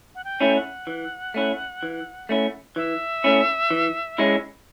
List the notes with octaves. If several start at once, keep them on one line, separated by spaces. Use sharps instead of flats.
F#5
G5
A3 C#4 E4
F#5
E3
A3 C#4 E4
E3
A3 C#4 E4
E3 E5
A3 C#4 E4
E3
G#3 C#4 E4